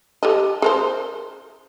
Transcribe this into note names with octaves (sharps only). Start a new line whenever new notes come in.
G4 A4 D#5
G#4 A#4 C5